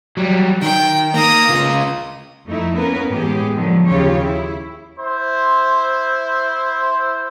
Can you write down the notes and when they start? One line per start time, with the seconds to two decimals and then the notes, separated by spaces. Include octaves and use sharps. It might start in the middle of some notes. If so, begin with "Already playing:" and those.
0.17 F#3 G3
0.62 D#3 G5
1.14 A#3 A#5 D#6
1.49 C#3 F4
2.45 F2 A3 D#4 E4
2.76 A#3 B3 C#4 A#4 B4
3.09 A2 E3 G#3 B3 G4 G#4
3.55 D3 D#3 F3 F#3 G#3
3.85 D#2 C#3 F4 G4 C#5
4.22 E4
4.99 E4 C5